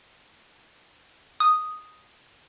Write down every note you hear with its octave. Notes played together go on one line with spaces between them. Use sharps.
D#6